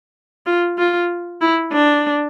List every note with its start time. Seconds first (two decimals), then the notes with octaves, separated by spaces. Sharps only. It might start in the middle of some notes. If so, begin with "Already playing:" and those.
0.46 F4
0.78 F4
1.41 E4
1.72 D4